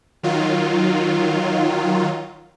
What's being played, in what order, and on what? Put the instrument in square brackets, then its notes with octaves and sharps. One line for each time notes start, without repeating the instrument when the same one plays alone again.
[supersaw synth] D#3 F#3 F4